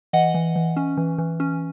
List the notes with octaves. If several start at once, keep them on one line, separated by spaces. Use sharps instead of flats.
E3 D#5 F#5
E3
E3
C#4
E3
E3
C#4